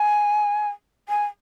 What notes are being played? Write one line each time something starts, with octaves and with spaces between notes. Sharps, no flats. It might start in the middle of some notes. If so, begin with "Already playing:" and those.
Already playing: G#5
G#5